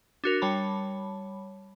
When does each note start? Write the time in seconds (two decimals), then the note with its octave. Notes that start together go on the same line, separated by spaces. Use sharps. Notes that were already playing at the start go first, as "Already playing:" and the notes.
0.24 D4 F#4 A#4
0.42 G3 C#5 A5 B5